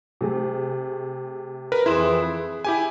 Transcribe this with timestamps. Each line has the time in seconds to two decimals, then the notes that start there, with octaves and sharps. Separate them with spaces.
0.21 C3 A3 G#4
1.72 A#4 B4
1.86 F2 E3 E4 G#4 B4 C6 E7
2.39 G#4
2.65 E4 G4 G#5